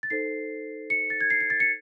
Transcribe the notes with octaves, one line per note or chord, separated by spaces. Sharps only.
A6
D#4 A4 C5 C7
C#7
A6
G#6
C7
C7
A6
C#7